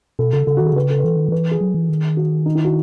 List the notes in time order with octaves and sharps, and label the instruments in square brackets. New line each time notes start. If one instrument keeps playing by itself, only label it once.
[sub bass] B2 [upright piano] A4
[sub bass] C#3 [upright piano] A4
[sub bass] C#3 [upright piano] A4
[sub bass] D#3 [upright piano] F#4
[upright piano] G#4
[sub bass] C#3 [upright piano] B4
[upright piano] A4
B4
[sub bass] E3 [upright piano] A4
[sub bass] D#3
[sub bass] E3 [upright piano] B4
[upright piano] G#4
[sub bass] F#3
E3
D#3
[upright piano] F#4
D#4
E4
F#4